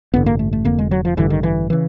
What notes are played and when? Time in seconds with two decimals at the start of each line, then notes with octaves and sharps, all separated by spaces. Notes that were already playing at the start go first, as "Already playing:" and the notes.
0.13 A1 G2 D3 B3
0.26 A#3
0.39 A3
0.53 A3
0.65 F1 F2 D3 A#3
0.78 G#3
0.91 F#3
1.05 F3
1.17 A1 G2 D3 E3
1.30 D#3
1.43 E3
1.70 C#3 E3